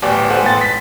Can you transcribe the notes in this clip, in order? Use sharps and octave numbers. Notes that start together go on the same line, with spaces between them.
D1 A1 B3 G4 D5
G4 A4 C5 F#5 G#5
A1 G#2 B3 G5 C6 A6
B6